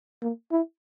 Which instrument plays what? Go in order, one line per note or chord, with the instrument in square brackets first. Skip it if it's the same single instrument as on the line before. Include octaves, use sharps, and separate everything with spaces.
[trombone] A#3
E4